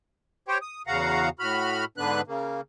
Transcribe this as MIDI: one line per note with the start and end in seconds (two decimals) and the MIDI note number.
0.48 0.58 67
0.48 0.58 72
0.48 0.58 73
0.48 0.58 79
0.62 0.82 87
0.87 1.29 40
0.87 1.29 49
0.87 1.29 66
0.87 1.29 77
0.87 1.29 78
0.87 1.29 82
1.39 1.85 45
1.39 1.85 66
1.39 1.85 83
1.39 1.85 89
1.98 2.21 44
1.98 2.21 50
1.98 2.21 59
1.98 2.21 62
1.98 2.21 71
1.98 2.21 90
2.27 2.61 49
2.27 2.61 58